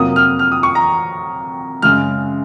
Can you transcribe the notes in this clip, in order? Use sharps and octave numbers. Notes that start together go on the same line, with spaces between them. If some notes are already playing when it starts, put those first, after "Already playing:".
Already playing: F2 C3 F#3 A#3 D#6
F6
F6
D#6
C#6
A#5
F#2 C#3 G#3 F6